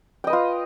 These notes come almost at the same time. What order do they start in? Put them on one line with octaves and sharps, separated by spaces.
G5 D#5 B4 F4